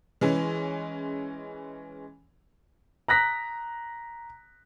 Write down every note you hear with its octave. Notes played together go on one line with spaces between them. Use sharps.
E3 G#3 C#4
A#5 F#6 A#6 B6